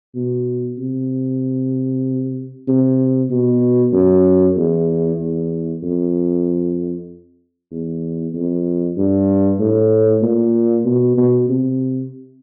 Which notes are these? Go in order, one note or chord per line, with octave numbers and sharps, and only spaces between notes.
B2
C3
C3
B2
F#2
E2
E2
F2
E2
F2
G2
A2
A#2
B2
B2
C3